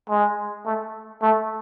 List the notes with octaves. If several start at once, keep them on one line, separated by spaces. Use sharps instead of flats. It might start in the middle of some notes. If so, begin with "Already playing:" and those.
G#3
A3
A3